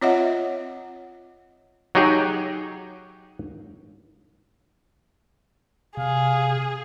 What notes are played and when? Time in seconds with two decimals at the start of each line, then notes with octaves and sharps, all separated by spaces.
0.01 C4 F4 C#5 D#5 E5 F#5
1.95 F#3 D#4 G4 G#4
5.97 C3 G#4 F5